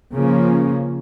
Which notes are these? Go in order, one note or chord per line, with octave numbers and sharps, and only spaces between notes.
C#3 F3 A#3 C#4